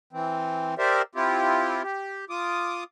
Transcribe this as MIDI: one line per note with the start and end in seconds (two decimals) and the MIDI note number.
0.13 0.75 52
0.13 0.75 60
0.78 1.02 67
0.78 1.02 70
0.78 1.02 72
0.78 1.02 74
0.78 1.02 76
1.15 1.83 60
1.15 1.83 64
1.15 1.83 65
1.15 1.83 67
1.83 2.25 67
2.30 2.84 65
2.30 2.84 86
2.30 2.84 87